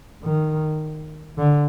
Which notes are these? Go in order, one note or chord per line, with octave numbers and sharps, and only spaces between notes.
D#3
D3